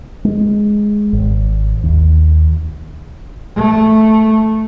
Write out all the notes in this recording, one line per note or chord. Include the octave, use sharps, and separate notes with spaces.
G#3
G#1
D#2
A3